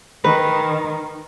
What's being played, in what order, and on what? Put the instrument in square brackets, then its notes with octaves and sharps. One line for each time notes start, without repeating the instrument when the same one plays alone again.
[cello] D#3 [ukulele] B4